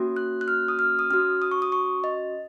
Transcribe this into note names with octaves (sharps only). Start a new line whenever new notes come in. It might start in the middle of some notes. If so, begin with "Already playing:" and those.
Already playing: A#3 C#4 F#4
F#6
F#6
F6
D#6
F6
D#6
C#4 F#4 F6
D#6
C#6
D#6
C#6
D#5